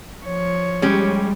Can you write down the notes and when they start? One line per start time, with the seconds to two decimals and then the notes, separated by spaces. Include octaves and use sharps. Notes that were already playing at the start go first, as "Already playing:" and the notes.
0.25 F3 C#5
0.82 G3 G#3 C#4 G4